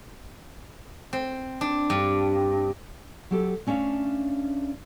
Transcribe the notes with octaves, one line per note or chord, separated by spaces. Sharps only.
C4
D4
G2
F#3 G4 A4
A3 C#4 D4 F5